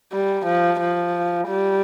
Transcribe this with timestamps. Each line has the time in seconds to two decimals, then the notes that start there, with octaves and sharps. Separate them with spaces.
0.13 G3
0.46 F3
0.80 F3
1.48 G3